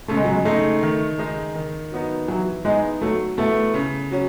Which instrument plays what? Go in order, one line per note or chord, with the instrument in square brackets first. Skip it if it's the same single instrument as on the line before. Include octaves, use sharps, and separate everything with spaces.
[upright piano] C#3 [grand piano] A3
[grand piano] G#3
F#3
G#3
[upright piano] G#3 D#4 [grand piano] A3
[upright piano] D#3
G#3 D#4
D#3
F#3 B3 D#4
[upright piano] E3 [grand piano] F#3
[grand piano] G#3 [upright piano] B3 D#4
[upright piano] F#3 [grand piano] A3
[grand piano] A3 [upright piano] B3 E4
[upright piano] C#3
F#3 C#4